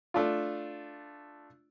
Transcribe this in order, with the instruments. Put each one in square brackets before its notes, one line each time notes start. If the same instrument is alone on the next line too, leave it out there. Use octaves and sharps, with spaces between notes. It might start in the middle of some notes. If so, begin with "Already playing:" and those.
[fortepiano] A3 D4 F4